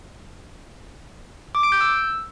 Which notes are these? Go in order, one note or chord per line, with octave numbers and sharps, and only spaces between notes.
D6
D7
G6
E6